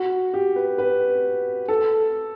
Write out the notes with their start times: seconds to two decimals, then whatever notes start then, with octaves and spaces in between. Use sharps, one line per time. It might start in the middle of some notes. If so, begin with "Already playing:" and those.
Already playing: F#4
0.34 G4
0.56 B4
0.78 B4
1.68 A4